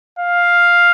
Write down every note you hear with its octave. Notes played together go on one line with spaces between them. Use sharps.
F5